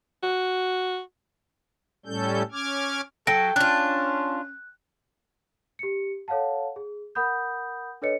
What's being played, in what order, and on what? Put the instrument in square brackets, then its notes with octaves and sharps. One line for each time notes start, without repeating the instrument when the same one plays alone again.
[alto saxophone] F#4
[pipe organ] A2 G3 C#4 A4 G6
C#4 D6 F6 G#6
[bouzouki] F#3 [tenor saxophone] A4 [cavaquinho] G5 [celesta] A#6 D7
[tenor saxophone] C#4 [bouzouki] D4 F4 [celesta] F#6
[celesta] G4 C#7
A4 C#5 F5 F#5 A5
G#4
A#4 F#5 B5 D#6 G6
D4 A4 B4 C#5 D#5 C#7